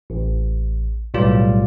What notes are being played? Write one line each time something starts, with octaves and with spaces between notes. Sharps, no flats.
A1
B1 A2 G3 F4 D5